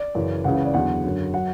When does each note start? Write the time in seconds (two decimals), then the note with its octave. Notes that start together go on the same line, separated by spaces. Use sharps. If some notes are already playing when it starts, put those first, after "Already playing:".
Already playing: D5
0.15 F#2 C#3 E3
0.44 C#2 C#3 E3 F#5
0.54 B4
0.65 D5
0.74 E2 D3 F#3 F#5
1.03 F#2 D3 F#3
1.34 F#3 F#5